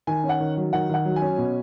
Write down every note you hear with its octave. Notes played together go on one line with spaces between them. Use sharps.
D#3 G#5
C#4
F#5
D#3
F#3
D#3 F#5
D#3 F#5
F#3
G#5
C#4
B2